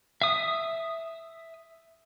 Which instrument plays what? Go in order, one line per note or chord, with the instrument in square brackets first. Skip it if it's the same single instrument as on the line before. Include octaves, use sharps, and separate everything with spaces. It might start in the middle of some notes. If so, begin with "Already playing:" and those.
[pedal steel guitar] E5 D#6